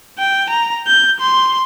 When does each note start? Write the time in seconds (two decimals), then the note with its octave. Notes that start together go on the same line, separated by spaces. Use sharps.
0.19 G5
0.50 A#5
0.87 G6
1.20 C6